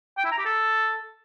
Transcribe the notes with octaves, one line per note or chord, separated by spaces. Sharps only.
G5
E4
A#5
G4
A4